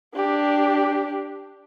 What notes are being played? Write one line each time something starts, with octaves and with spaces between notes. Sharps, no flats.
D4 G4